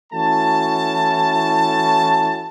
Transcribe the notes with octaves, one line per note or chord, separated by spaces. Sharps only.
E3 A3 C#4 E4 F#4 A5